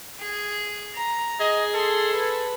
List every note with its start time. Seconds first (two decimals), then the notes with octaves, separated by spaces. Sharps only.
0.19 G#4
0.94 A#5
1.40 G#4 D#5
1.74 A4 C6
2.11 B4